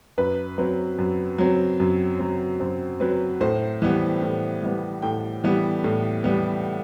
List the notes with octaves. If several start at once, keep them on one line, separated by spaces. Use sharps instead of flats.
F#2 B4
F#3 C4 B4
F#2
F#3 C4
F#2
F#3 C4
F#2 C5
F#3 C4 B4
A2 C5
E3 G3 B3
A2
E3 G3 B3
A2 G5
E3 G3 B3
A2
E3 G3 B3